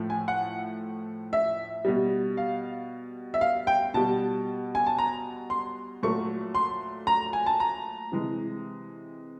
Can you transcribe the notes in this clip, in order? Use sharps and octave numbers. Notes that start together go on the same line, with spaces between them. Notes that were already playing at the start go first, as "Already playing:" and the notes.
Already playing: A2 F3 A3
G#5
F#5
E5
B2 G3
F5
E5
F5
G5
B2 G3 A5
G#5
A5
A#5
C6
A#2 F#3 A3 C#6
C6
A#5
G#5
A5
A#5
C3 E3 G#3